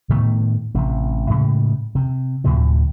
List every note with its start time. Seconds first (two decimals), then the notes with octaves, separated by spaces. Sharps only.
0.09 A2 D#3 A3 B3
0.75 A1 C3
1.30 A2 C#3 G#3
1.95 C3
2.44 D2 A2 C3 F3